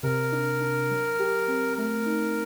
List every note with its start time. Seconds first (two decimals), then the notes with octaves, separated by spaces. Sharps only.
0.03 C3 A#4
0.32 D4
0.61 D4
0.90 F#3
1.19 G4
1.48 C4
1.77 A3 A#4
2.06 D#4